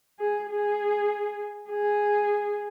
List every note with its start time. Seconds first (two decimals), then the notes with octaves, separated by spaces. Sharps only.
0.19 G#4
0.50 G#4
1.70 G#4